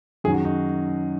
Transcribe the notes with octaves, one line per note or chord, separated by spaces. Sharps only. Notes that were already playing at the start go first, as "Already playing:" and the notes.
F#2 D#3 F#3 G#4
F#4
D#4